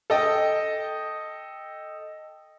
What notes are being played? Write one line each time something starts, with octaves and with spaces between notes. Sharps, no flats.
A4 D#5 G5